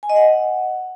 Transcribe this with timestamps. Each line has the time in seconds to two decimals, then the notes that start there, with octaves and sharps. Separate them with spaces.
0.03 G#5
0.10 D#5
0.16 F#5